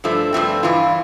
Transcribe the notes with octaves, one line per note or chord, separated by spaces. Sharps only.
G2 F3 A3
G2 F3 A3 C4
G2 E3 F4